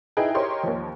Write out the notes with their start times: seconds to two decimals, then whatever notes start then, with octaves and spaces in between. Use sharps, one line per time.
0.17 D#4 E4 G#4 B4 G5
0.34 G4 A#4 C5 C#5 D#5 C6
0.63 D#2 F3